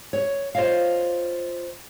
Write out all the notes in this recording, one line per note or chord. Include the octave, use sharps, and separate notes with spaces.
C#5
F4 C5 C#5 D#5 F5